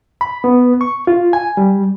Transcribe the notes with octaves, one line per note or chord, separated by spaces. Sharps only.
B5
B3
C#6
F4
G#5
G3